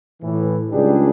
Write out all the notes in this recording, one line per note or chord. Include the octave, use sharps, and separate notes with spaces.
A2 E3
C#2 D#3 G3 D4 G4 G#4